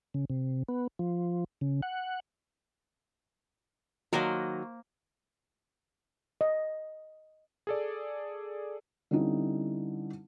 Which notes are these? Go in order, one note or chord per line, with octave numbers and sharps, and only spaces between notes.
C#3
C3
B3
F3
C#3
F#5
D#3 F#3 A#3 A#4 C5
D#5
G#4 A4 D5
D3 G3 C4 C#4 D#4 E4